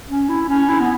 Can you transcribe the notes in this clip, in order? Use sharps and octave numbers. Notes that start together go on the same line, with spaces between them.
C#4
E4
C#4
E4
B3